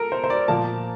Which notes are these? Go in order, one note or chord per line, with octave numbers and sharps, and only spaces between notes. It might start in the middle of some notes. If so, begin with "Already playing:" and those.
Already playing: A4 A#4
C5
C5
D5
A#2 F3 A#3 A5